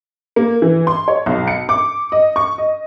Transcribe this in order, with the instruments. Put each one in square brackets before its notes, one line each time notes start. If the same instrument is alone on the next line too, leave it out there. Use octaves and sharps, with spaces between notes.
[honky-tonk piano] A#3
E3
C6
C#5
B1
C#7
D6
D#5
C#6
D#5